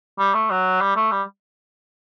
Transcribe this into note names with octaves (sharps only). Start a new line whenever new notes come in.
G3
A3
F#3
G3
A3
G3